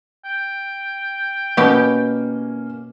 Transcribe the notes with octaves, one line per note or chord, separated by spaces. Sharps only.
G5
B2 A#3 C#4 G4